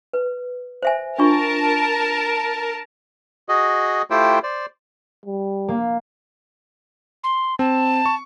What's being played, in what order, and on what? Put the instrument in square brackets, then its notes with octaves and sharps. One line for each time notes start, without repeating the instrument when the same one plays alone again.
[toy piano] B4
C5 E5 G#5
[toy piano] D4 F4 C#6 [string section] A#4 A5
[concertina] F#4 G#4 D#5
A3 E4 F4 G4 C5 G5
C5 D5
[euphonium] G3
[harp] A#3
[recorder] C6
[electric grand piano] C4 [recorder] A5
[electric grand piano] C#6